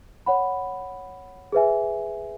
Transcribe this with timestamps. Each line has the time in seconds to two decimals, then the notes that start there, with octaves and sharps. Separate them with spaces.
0.26 C#5 F#5 B5
1.52 G#4 B4 E5 G#5